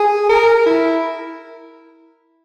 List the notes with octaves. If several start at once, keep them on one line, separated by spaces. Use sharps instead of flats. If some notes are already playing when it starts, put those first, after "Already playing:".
Already playing: G#4
A#4
E4